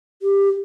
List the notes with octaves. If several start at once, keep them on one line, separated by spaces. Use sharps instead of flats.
G4